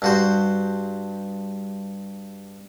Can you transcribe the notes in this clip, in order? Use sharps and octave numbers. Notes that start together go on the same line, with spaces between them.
G2 F#4 C5